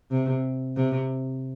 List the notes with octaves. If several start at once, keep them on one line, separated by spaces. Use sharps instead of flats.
C3
C3